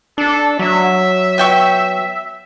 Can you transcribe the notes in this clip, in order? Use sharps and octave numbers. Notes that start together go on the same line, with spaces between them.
D4 A4
F#3 E5
B3 G5 C#6